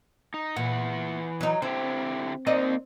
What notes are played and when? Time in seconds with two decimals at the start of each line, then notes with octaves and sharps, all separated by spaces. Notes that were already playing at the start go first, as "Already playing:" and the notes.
0.34 D#4
0.56 A#2 E3 F#5
1.41 F#3 D#4
1.62 D3 C4 E4 G4
2.47 A#3 C4 D#4 D5 D#5